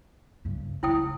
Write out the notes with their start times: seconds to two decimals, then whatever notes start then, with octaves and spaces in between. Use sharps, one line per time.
0.45 G2 C#3
0.83 C#3 G#3 E4 G5 D#6